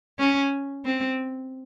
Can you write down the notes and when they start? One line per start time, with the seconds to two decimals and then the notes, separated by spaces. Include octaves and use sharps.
0.19 C#4
0.85 C4